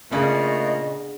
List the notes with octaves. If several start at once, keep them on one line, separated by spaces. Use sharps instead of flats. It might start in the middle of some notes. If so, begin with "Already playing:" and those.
A#2 C#3 A3 B3 C#4 D4 G#4 D#5